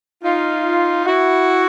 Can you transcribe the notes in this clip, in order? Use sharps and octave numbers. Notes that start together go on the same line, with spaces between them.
D#4 F4
E4 F#4